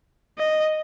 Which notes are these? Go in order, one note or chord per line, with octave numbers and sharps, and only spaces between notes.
D#5